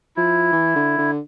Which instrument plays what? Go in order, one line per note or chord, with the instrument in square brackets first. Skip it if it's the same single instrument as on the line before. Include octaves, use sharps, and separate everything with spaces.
[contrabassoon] F3 [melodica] E4
[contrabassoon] E3
D3
D3